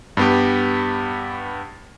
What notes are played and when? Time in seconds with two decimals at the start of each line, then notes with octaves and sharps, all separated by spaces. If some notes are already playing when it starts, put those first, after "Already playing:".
0.17 G2 B3 G4